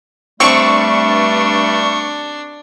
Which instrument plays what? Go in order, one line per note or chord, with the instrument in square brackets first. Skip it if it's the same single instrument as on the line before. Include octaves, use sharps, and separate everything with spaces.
[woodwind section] G2 G3 A3 [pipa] C4 [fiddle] D4 [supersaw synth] C#6